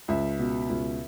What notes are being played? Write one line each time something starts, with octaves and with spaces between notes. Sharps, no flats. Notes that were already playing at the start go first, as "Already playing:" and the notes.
C#2 E5
B2
C#2